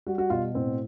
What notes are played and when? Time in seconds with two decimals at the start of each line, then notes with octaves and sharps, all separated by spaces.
0.07 G3 F#4
0.18 F#4
0.30 B2 F4
0.55 A2 C4